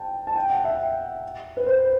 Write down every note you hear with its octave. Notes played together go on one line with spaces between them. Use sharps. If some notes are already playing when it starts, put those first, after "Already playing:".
Already playing: G5 A5
A5
G5
F#5
E5
B4
C5